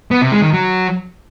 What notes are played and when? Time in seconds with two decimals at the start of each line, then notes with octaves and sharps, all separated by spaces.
0.11 B3
0.22 C3
0.32 G#3
0.43 D#3
0.53 F#3